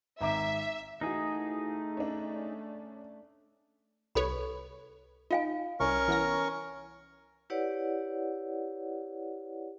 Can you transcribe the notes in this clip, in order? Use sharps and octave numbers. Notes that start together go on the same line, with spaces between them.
G#1 E5 A#5 D6
E3 A3 D#4 F#4 G#4
C#4 D4
C2 A4 B4 C#5 B5
D#4 F4 F5 G#5
C2 C#4 A#4 C#6
E3 B3 A#6
E4 G4 B4 C#5 D5 F#5